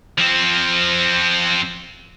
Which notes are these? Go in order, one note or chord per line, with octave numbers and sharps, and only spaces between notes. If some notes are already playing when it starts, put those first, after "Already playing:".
F3 C4